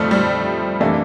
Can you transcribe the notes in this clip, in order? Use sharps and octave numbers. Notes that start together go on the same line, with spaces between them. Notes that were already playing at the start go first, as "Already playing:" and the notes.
Already playing: F2 F3 G3 A3 C4
G3
C3 E3 A3 A#3 D4